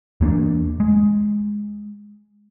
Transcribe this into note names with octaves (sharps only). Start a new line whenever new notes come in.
E2 A#3 C4 D4
G#3